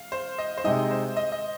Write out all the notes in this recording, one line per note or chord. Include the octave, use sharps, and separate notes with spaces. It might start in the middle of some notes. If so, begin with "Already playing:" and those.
Already playing: F5
C5
D#5
C5
C3 G#3 D#4 D#5
C5
D#5
D#5